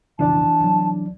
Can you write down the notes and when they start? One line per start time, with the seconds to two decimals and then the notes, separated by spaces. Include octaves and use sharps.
0.19 B1 F2 C#3 E3 D4 D5 A5
0.60 C2 F#3